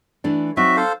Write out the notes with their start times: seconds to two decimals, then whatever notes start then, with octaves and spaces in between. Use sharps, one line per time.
0.24 E3 A3 D4
0.57 F#3 C4 D#4 F#4 E5
0.77 A4 C5 F5